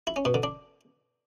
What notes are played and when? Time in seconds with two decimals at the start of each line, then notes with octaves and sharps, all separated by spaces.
0.07 E4
0.16 C#4
0.25 B2
0.34 D3
0.43 D4